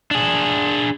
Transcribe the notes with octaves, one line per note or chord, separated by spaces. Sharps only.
D4 G#4